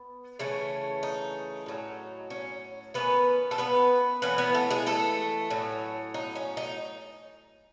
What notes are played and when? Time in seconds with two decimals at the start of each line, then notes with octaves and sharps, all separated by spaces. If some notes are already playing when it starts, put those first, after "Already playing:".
Already playing: B3
0.39 C#3 E3 A3 C#4
1.03 D#4
1.66 A2 F#3 C#4
2.30 C#4
2.94 D#3 A3 B3 C#4 B4
3.51 A4
3.58 B3 B4
4.22 E3 A3 B3 C#4 B4
4.38 B3 B4
4.54 A3 A4
4.71 G#3 G#4
4.86 A3 A4
5.50 A2 F#3 C#4
6.14 D#4
6.35 C#4
6.57 D#4